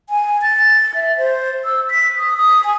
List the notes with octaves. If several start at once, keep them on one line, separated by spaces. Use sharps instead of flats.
G#5
A6
E5
C5
E6
B6
D#6
D#6
G#5